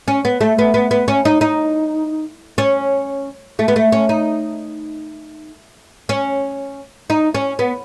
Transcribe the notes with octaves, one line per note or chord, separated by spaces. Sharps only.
C#4
B3
A3
B3
B3
B3
C#4
D#4
D#4
C#4
A3
B3
A3
C#4
D#4
C#4
D#4
C#4
B3